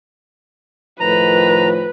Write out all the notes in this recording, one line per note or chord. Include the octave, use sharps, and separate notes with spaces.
A2 D#3 F3 B4 A#5